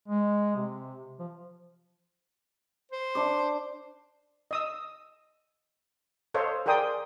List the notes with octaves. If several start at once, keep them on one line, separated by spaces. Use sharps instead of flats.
G#3
C3
F3
C5
D4 C6 D6
D#5 D#6 E6
A4 C5 C#5 D#5 F5
G#4 A#4 D5 G5 C6 D#6